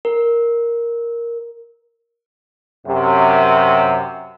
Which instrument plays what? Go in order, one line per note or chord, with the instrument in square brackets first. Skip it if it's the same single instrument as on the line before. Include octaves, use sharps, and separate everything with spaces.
[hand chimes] A#4
[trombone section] F#2 C3